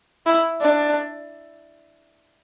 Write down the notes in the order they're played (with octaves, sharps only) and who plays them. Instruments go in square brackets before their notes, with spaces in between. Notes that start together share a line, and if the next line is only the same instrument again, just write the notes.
[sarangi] E4
D4